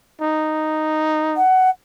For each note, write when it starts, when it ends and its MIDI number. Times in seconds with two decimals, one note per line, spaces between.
0.21 1.41 63
1.36 1.70 78